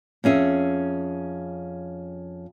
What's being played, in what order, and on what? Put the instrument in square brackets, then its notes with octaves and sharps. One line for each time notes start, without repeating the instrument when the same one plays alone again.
[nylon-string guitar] F2 C#4 G#4 E5